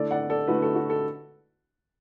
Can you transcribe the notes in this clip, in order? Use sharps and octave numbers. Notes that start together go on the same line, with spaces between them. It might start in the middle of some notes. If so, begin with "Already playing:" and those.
Already playing: D3 A3 E4 A4 D5
D5 F#5
A4 D5
D3 A3 E4 F#4 B4
A4
F#4
A4